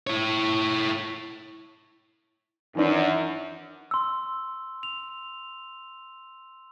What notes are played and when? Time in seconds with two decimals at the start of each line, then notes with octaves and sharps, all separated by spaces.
0.07 E4 C#5
2.75 F#2 D#3 E3 D4
3.91 C6 E6
4.83 F7